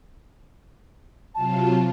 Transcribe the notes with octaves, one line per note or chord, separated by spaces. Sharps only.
C3 F#3 F4 A5